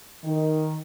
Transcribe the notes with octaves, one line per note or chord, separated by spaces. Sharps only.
D#3